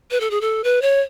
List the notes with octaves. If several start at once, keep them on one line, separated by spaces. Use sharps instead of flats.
B4
A4
G#4
A4
B4
C#5